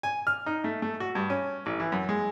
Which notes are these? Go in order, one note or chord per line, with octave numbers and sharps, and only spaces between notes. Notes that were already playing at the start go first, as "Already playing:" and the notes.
G#5
F6
D#4
A3
A3
F#4
G2
C#4
A1
E3
F#2
G#3